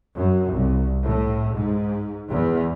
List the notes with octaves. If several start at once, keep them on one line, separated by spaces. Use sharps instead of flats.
F#2
C2
A2
G#2
E2